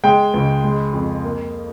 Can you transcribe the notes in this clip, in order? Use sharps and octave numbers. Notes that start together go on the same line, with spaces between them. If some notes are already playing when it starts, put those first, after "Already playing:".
G#3 G5
C#2
G#3
F2
A#3